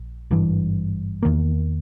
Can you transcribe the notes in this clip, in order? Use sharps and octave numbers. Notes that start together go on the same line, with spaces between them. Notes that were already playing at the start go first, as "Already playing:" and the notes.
Already playing: A#1
G#1 G2 E3
E2 D#3 A#3